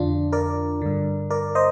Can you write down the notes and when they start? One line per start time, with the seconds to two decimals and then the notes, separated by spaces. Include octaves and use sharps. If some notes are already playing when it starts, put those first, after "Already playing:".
Already playing: F2 D3 D4 F4
0.32 A#4 D5
0.82 G2 D3
1.30 A#4 D5
1.55 C5 D#5